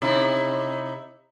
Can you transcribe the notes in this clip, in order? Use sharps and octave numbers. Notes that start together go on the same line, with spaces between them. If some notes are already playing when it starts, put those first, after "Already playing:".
C3 D#4 E4